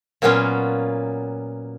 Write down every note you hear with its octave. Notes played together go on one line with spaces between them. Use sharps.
A#2 F#3 A#3 B3 C#4 F4